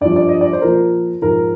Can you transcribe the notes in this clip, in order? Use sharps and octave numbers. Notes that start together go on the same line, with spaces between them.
G2 F3 D5
D5
D#5
D5
C5
A#2 F3 A#4
G#2 F3 A#4